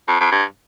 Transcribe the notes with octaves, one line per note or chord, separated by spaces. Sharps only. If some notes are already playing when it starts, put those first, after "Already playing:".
F2
F2
G2